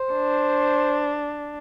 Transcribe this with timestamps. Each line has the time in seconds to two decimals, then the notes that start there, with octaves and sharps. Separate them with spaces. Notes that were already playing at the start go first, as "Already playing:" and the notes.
Already playing: C5
0.14 D4